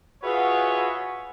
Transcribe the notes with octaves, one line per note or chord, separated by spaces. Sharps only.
F4 F#4 G#4 B4 C#5 E5